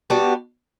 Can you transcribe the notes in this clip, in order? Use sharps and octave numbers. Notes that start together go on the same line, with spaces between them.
G3 B3 D4 F#4